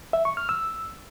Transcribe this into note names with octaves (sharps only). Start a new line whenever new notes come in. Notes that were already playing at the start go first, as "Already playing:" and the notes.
E5
C#6
F6
E6